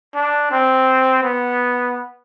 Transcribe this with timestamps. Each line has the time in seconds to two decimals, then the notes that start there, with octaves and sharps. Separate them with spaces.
0.15 D4
0.51 C4
1.22 B3